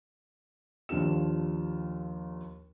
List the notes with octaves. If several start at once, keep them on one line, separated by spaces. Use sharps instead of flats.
D#2 F3 D4 F4 G4 E7